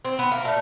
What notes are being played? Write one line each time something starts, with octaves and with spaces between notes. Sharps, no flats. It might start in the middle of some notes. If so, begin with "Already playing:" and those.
C4
B3
A#3
A#2 A3